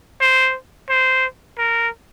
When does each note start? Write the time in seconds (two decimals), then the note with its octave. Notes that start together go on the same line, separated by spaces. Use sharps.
0.20 C5
0.89 C5
1.58 A#4